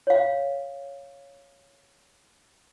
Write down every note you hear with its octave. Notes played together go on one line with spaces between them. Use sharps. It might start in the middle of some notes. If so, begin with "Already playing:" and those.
C#5 F5